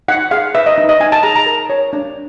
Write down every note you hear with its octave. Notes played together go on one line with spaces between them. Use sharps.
D#4 F#5
G#4 F5
B4 E5
D#5
D#4
D#5
D#4 G#5
A5
G#4 A#5
A#5
A#4
C#5
D4